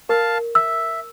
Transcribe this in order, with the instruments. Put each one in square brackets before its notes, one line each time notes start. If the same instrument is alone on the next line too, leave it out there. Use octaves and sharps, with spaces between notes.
[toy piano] A#4 [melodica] F5 A5
[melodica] E5 [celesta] E6